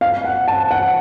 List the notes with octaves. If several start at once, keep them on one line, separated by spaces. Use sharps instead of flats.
F5
F#5
A5
F#5